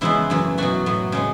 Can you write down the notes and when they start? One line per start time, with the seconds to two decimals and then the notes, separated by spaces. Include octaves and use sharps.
0.01 C#3 E3 G#3 B3 E4
0.30 F#2 E3 A3
0.58 B2 F#3 A3 F#4
0.86 A2 F#3 B3
1.12 C#3 G#3 B3